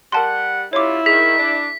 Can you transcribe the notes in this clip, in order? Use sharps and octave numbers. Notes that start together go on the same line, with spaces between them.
G3 A#4 F#5 A5 C6
G3 C#4 E4 F4 C#5 D6
D#3 G#4 B6
D4